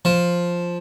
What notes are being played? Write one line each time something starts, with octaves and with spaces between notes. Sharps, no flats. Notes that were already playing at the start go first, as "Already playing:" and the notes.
F3